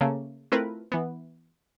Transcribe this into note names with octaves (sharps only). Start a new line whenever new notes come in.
C#3 A3 A#3
A3 C4 E4 F4 A#4 B4
E3 B3